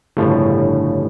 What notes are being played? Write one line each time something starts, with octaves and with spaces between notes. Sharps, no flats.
G1 A2 C#3 F3